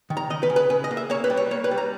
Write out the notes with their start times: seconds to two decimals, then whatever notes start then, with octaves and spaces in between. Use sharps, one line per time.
0.10 D#3
0.17 A#5
0.30 C#3 D#5
0.43 B4
0.50 C#3
0.56 B4
0.70 C#3 B4
0.84 D#5
0.91 A#3
0.97 E5
1.10 A#3 C#5
1.24 B4
1.30 G3
1.37 C#5
1.51 A#3 C#5
1.64 B4
1.71 G3
1.78 A#5